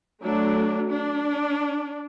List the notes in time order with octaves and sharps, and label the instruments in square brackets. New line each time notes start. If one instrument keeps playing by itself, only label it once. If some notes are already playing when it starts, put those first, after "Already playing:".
[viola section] F#3 A3 D4
D4